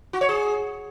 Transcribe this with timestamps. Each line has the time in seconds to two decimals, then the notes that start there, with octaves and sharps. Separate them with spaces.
0.13 F#4
0.21 C#5
0.29 G#4